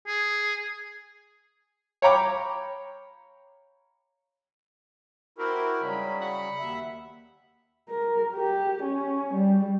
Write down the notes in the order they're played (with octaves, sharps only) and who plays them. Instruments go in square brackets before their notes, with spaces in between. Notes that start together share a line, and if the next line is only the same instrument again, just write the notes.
[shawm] G#4
[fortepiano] C#5 F5 G5 A#5 B5 D6
[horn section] C4 G4 [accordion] E4 F#4 A#4
[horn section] G#2 C#4 B5 [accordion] C#3 F#3 G3
[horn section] F#5 B5
[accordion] D#2 E5
[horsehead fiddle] A#4
G4
C#4
G3